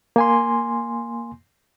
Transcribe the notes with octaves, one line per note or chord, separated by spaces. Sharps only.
A#3 G#5 C6